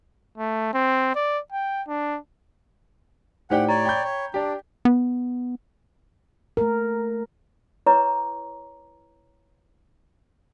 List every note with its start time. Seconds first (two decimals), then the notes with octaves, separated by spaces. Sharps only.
0.38 A3
0.74 C4
1.15 D5
1.52 G5
1.88 D4
3.50 A2 D#4 G4 C5 D5 F#5 G5
3.69 C#5 D5 A#5
3.85 G5 B5 G6
4.04 C#5
4.34 D4 G4 D5
4.85 B3
6.57 A3 A#4
7.86 E4 B4 C#5 A#5 C#6 D6